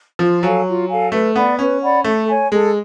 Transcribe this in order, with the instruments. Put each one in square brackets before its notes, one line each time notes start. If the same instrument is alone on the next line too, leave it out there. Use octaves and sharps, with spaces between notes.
[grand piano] F3 [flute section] F4
[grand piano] F#3 [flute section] A4 F5 G#5
[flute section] F4
A4 F5 G#5
[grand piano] A3 [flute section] B4
[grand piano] B3 [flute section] D5 F#5 B5
[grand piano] C#4 [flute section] B4
[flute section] D5 F#5 B5
[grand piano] A3 [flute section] A4
[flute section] C#5 G#5
[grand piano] G#3 [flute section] A4